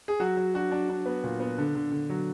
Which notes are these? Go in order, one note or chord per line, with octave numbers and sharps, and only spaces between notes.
G#4
F#3 F#4
F#3
D4 F#4
D4
D4
B3
A#2
B3
D3
D3
D3
F#3